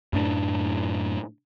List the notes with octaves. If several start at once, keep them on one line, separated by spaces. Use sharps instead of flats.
F#2 A2 D4